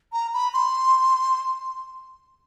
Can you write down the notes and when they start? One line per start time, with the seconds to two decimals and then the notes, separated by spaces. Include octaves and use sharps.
0.13 A#5
0.34 B5
0.54 C6